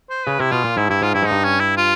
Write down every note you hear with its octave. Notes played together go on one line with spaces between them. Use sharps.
C5
C#3 B4
C3 E4
B2 F4
A#2
G#2 E4
G2 E4
G#2 F4
G2 E4
G#2
G2 D#4
C#4
E4
F4